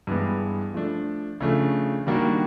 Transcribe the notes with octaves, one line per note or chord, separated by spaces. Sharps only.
G2 E3 G#3 B3
F3 A3 D4
C#3 F3 A3 D4
D#3 G3 A#3 D4 F#4